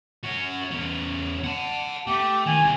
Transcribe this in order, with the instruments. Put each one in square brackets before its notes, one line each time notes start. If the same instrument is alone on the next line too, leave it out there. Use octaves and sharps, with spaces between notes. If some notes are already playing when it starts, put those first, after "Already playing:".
[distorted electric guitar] C#4 F#4
E2 C#4
F#5 A5
[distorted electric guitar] A3 [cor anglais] G4
[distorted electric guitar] D#3 [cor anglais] G#5
[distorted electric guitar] C2 C4